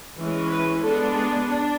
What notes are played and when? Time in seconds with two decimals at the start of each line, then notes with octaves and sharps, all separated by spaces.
0.16 E3 G#3 C#4
0.49 B4
0.82 G#3 B3 D4 A4
1.15 G#4
1.48 D4